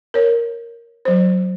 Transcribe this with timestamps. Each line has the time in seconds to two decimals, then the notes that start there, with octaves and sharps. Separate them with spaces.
0.14 A#4 C#5
1.05 F#3 C5